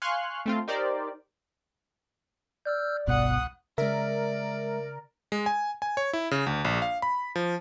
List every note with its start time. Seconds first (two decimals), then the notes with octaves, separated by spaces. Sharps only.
0.02 F5 G#5 C6 C#6 F6 F#6
0.46 A3 C4 F4
0.68 D#4 G4 A#4 C5 D5
2.65 D5 E6 F6 G6
3.07 G1 C2 B2 F#5 D#6 F#6
3.78 C#3 G#3 A#4 D5 E5
5.32 G#3
5.46 G#5
5.82 G#5
5.97 C#5
6.13 E4
6.31 C#3
6.46 D2
6.65 A#1
6.82 F5
7.02 B5
7.36 F3